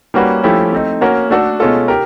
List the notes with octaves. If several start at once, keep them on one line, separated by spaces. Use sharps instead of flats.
G3 A#3 C#4 F#4 B4
F3 A3 C#4 E4 G4
A3 C4 D#4
A#3 C#4 F#4 A#4
A3 D4 F#4 A4
B2 G#3 C#4 F4 A4
G4 A#4